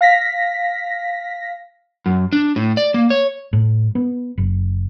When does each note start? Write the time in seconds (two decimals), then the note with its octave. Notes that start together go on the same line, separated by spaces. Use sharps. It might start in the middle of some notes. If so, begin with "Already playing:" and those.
0.01 F5 A#6 B6
2.06 F#2
2.33 D4
2.56 A2
2.77 D5
2.94 A#3
3.10 C#5
3.53 A2
3.95 B3
4.38 F#1